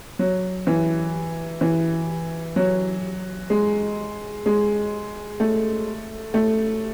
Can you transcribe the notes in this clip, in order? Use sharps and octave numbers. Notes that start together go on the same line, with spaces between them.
F#3
E3
E3
F#3
G#3
G#3
A3
A3